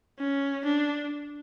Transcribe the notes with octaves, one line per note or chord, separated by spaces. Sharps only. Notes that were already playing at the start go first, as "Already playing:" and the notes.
C#4
D4